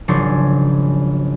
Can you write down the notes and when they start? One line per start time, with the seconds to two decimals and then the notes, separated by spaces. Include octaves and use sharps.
0.08 G#1 C#3 F3 F#3 D4 C6